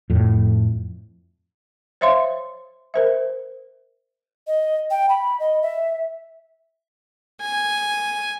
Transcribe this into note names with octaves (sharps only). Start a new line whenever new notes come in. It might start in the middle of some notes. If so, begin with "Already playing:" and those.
F2 A2
C5 C#5 E5 F5 C6
A#4 C5 E5
D#5
G5
B5
D#5
E5
G#5